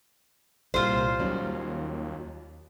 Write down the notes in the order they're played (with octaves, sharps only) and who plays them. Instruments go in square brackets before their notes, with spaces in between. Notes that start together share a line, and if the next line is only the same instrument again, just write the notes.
[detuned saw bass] C2 [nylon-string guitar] A#2 G3 [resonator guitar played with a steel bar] F4 C5
[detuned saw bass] D#2 [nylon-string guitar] F#3 G3 C#4